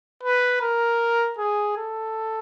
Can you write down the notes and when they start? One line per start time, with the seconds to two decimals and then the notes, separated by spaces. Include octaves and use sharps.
0.23 B4
0.62 A#4
1.38 G#4
1.77 A4